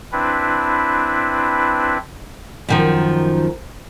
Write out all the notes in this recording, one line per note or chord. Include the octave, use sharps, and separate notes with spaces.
C4 D4 E4 B4
F#2 D#3 F3